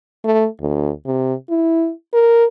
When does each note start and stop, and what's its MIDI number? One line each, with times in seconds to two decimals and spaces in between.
0.24 0.46 57
0.60 0.90 38
1.06 1.34 48
1.50 1.91 64
2.13 2.45 70